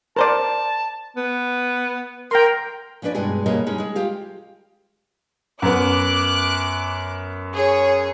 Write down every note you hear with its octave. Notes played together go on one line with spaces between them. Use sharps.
A#4 C5 D5 A5
B3
A#4 G5 C6
F3 C#4 D4 B4 D5
G2 B2 G#3 E4 G#4
B2 G3 G#3 A#3 C#5 D#5
G3 G#3 C#4 D#4
G#3 G#4
F4 G4 F5
F#2 B3 D6 F#6
G#4 C#5